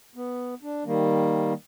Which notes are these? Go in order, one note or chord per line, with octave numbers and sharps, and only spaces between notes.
B3
D4
D#3 G3 A#3